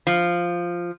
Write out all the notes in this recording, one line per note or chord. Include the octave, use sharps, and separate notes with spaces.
F3